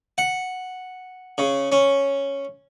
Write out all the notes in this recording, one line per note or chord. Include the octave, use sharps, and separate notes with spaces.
F#5
C#3
C#4